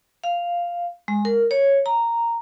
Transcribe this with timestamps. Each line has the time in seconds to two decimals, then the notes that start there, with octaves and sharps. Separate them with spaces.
0.24 F5
1.08 G#3
1.25 A#4
1.51 C#5
1.86 A#5